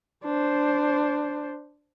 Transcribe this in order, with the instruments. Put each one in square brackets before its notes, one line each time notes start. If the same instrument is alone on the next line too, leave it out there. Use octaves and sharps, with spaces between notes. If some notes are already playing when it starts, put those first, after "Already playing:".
[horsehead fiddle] D4 C5